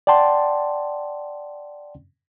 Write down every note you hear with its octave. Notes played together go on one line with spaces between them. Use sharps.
D5 F#5 G5 A5 C6